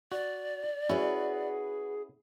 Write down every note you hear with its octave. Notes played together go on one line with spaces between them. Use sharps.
F#4 D5
C#4 E4 F#4 G#4 B4